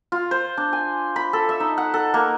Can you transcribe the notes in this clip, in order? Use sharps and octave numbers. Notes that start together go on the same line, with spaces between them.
F4
C5
D4
G#5
B5
A4
E5
D#4
F#5
A4
A#3